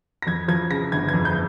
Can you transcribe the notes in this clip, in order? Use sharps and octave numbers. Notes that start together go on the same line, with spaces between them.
A#6
F2 G#6
F3 G#6
C#3 A#6
G1 G#6
F2 G#6
G6